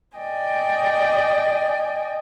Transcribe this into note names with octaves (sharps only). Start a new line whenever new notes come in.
D5 D#5 G5 G#5